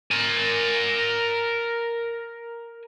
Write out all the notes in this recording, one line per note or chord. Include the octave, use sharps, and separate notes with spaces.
A#4 G#5